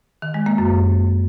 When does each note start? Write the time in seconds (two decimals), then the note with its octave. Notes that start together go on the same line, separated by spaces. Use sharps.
0.22 D#3
0.34 G#3
0.46 A#3
0.58 F#2